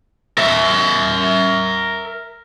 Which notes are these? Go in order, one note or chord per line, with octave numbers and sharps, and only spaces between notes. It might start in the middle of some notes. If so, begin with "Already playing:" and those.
A#4 E5